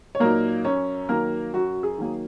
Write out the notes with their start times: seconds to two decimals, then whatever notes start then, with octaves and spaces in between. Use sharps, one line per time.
0.15 C#5
0.20 A#2 F#3 A#3 D#4 A#4
0.65 F#2 C#4 C#5
1.09 D#3 F#3 A#3 A#4
1.54 F#2 F#4
1.83 G#4
1.98 D#3 F#3 A#3